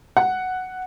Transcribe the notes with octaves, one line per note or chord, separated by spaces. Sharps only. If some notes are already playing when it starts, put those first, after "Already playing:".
F#5